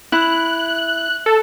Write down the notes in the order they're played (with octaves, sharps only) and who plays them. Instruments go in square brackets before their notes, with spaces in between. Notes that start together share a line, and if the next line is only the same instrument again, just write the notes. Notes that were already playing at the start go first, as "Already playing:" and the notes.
[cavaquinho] E4 [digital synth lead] F#6
[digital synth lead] A4